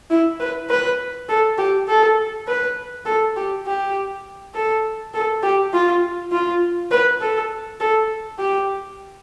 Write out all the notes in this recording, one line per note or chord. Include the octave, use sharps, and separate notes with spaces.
E4
B4
B4
A4
G4
A4
B4
A4
G4
G4
A4
A4
G4
F4
F4
B4
A4
A4
G4